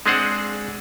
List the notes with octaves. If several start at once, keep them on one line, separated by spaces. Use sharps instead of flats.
G#3 C4 D4 G#4 C5 F#5